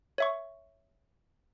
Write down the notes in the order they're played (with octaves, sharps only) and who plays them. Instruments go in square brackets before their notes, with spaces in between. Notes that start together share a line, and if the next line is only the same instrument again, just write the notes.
[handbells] C#5 E5 C#6